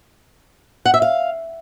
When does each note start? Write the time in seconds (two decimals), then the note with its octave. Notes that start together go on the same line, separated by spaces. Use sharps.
0.86 F#5
0.94 E5
1.02 F5